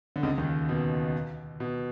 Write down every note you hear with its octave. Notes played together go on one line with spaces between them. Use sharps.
D3
C#2 C#3
D#2 D#3
B2
B2